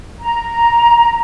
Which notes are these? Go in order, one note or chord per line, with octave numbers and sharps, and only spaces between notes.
A#5